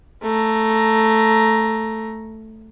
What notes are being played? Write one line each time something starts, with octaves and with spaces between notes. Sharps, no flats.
A3 A#5